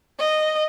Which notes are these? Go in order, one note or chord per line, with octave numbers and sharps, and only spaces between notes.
D#5